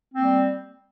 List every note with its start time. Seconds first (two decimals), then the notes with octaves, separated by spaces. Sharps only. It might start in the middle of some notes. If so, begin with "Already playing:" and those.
0.13 C4
0.17 A#3
0.20 G3